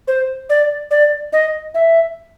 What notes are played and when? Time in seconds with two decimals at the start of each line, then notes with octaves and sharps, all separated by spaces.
0.08 C5
0.50 D5
0.91 D5
1.33 D#5
1.74 E5